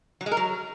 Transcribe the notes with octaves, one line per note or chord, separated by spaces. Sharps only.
F#3
G#3
A#4
F#3